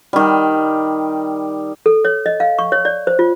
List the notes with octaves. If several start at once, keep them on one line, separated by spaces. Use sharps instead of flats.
D#3 G3
A4
C#5
D#5
F5
C#6
C#5
D5
C5
F4